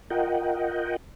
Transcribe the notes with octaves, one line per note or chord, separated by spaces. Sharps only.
F4 A#4 D#5 F#5 G5